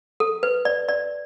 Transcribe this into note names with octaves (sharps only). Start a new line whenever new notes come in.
A4
B4
D5
D5